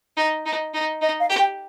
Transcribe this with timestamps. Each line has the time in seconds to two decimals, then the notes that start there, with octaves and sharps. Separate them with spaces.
0.17 D#4
0.46 D#4
0.74 D#4
1.01 D#4 D#5
1.20 F5
1.29 G4
1.39 G5